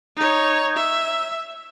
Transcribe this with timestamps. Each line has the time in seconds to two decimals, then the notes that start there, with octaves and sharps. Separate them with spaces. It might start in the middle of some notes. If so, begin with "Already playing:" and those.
0.16 D#4 C#5
0.76 E5